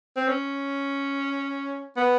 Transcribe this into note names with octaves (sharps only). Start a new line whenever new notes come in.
C4
C#4
B3